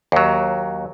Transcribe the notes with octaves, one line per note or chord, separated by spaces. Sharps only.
D#2 F#3